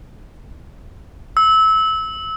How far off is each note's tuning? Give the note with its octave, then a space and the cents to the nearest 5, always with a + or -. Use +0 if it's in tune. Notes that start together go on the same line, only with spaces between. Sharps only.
E6 -25